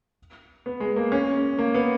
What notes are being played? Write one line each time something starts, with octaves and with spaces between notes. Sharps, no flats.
B3
G#3
A#3
C#4
A#3
B3